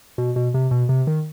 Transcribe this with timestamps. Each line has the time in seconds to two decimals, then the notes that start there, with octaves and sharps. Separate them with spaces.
0.18 B2
0.36 B2
0.54 C3
0.71 B2
0.89 C3
1.07 D#3